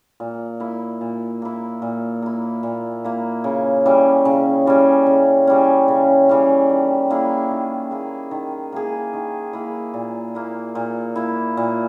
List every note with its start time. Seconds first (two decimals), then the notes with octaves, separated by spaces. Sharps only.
0.20 A#2
0.60 A#3 E4
1.01 A#2
1.42 A#3 E4
1.82 A#2
2.22 A#3 E4
2.63 A#2
3.04 A#3 E4
3.44 C#3
3.86 E3 G3 C#4
4.25 C#3
4.66 E3 G3 C#4
5.06 C#3
5.47 E3 G3 C#4
5.88 C#3
6.29 E3 G3 C#4
6.69 D#3
7.10 A#3 E4 G#4
7.51 D#3
7.91 A#3 E4 G#4
8.31 D#3
8.72 A#3 E4 G#4
9.14 D#3
9.53 A#3 E4 G#4
9.94 A#2
10.35 A#3 E4
10.75 A#2
11.16 A#3 E4
11.57 A#2